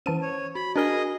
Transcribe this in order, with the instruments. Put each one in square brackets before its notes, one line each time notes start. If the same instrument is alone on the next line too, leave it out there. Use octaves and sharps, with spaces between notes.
[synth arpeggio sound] E3 A5 D#7 [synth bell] C#4 C5
[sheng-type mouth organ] C#5
[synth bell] F#4 [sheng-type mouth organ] B5
[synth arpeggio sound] D4 A#4 [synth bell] F#4 G7 [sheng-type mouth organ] G#4 D#5